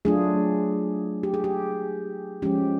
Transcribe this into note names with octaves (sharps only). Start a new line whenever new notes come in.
F#3 A3 D4 F4 G#4
G4
G#4
G4
F3 G#3 C#4 G4